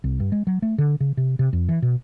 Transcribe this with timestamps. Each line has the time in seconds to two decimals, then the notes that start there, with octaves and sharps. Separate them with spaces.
0.04 C2
0.20 G2
0.32 G#3
0.47 F#3
0.62 A3
0.78 D3
1.00 C#3
1.17 C3
1.39 C3
1.53 F2
1.69 E3
1.82 B2